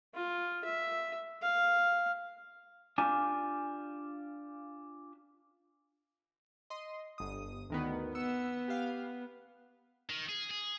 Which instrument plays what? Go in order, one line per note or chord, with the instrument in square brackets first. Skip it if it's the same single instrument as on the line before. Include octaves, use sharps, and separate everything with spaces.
[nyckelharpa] F4
E5
F5
[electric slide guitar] D4 F4 G4 G#5
[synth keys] D#5 C6
G1 D#6
D2 D#3 B3
[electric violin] B3 [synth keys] E6 C#7
[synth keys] G4 F5
[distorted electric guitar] D#3
G#4
G#4